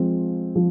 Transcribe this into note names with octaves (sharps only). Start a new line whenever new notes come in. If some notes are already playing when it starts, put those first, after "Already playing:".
Already playing: F3 G#3 C4
F3